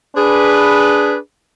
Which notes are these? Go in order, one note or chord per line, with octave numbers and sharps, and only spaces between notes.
D4 G#4 B4